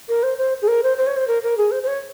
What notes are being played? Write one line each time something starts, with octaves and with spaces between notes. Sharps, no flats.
A#4
C5
C5
G#4
A#4
C5
C5
C#5
C5
A#4
A#4
G#4
C5
C5
C#5